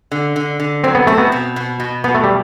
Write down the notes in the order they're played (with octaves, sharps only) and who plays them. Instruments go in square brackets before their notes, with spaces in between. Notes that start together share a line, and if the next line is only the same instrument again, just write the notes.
[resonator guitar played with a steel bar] D3
D3
D3
[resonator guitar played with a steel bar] F#3 [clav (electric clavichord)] C4
[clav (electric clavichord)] B3
[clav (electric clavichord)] A3 [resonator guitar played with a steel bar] C4
[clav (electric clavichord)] B3
[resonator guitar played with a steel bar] B2
B2
B2
[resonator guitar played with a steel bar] B2 [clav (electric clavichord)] B3
[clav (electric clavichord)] A3
G3